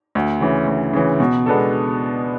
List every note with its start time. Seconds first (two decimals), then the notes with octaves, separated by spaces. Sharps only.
0.15 D2
0.41 C#3 E3
0.68 D2
0.93 C#3 E3
1.20 B2
1.46 G#3 B3 D4 A4